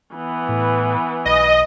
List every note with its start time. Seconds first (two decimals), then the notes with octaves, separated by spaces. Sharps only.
0.15 E3 B3
0.49 A2
1.25 B1 D#5